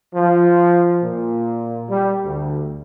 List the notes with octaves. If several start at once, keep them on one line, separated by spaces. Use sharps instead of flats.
F3
A#2
G3
D2